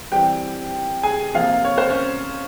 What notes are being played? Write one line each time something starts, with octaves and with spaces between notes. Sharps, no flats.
E3 G3 C4 G4 G5
G#4 G#5
C3 F3 A#3 F4 F5
C#5
C5
C#4 C#5